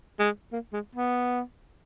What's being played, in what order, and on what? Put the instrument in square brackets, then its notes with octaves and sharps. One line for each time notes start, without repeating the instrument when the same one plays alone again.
[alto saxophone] G#3
A#3
G#3
B3